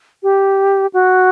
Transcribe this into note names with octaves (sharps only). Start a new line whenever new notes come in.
G4
F#4